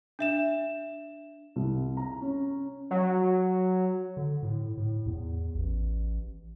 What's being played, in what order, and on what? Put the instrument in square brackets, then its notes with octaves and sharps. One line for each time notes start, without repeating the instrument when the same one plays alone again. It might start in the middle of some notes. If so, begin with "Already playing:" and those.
[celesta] D4 E5 E7
[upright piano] C2
A#5
C#4
[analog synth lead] F#3
[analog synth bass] D3
A2
A2
E2
A1